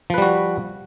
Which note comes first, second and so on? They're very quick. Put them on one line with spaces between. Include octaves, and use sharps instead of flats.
F3 B4 G3 F#4